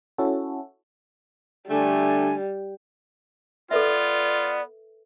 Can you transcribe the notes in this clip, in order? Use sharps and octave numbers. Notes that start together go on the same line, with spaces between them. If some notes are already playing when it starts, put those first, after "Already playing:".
C#4 E4 F#4 A4
D3 G3 A3 D4 G#5
B3 F4 A4 B4 D5 E5